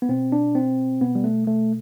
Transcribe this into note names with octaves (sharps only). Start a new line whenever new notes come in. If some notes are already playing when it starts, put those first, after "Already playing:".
B3
B2 C4
D4
C4
B2 B3
G3
A3
A3